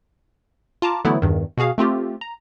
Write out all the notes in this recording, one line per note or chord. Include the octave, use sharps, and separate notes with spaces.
F4 A5 A#5 D6
D3 E3 F#3 A3 B3 E4
E2 G2 D#3
B2 F#4 G#4 F5
A3 C4 F4 G4
A#5